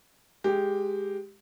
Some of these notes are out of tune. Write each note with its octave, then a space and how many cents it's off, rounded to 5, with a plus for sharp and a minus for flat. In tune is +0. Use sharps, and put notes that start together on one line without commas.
G#3 +0 G4 +0